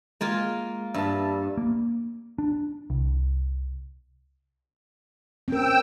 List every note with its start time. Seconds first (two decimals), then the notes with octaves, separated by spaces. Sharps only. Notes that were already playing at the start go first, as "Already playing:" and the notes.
0.21 G#3 A#3 F4 G#5
0.94 G2 E5 A5
1.57 A#3
2.38 D4
2.90 C2
5.48 C4 C#4 A#4 G5 E6